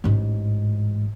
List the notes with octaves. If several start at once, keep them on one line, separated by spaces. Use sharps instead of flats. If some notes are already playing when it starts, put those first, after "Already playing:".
A1 G#2